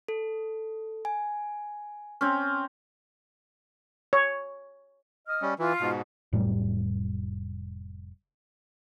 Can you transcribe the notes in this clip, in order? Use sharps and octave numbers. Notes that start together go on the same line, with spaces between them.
A4
G#5
C4 C#4
C#5
D#5 D#6 F6
G3 C#4
E3 F4
G#2 B2
F1 A2 F#3 G3